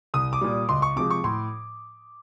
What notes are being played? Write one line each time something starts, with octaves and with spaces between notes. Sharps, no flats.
C2 D#6
D6
A#2 G3
C#2 C6
C#6
C3 F3 G#3 D6
C#6
A2 C6